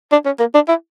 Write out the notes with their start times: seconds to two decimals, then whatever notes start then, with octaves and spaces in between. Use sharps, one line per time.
0.12 D4
0.25 C#4
0.39 A#3
0.54 D4
0.68 E4